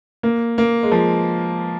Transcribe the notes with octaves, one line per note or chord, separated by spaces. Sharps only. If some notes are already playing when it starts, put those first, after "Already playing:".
A#3
A#3
G#3
F3